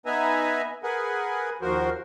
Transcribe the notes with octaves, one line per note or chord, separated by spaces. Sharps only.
B3 D#4 B4 E5 G#5 A#5
G#4 A#4 B4 F#5 G#5
D#2 F3 F#4 A#4 C5